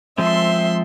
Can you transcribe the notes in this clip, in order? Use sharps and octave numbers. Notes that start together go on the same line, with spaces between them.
F3 G#3 C4 E5 C6